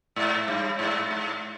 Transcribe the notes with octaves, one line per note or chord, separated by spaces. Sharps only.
G#2
G2
G#2
G#2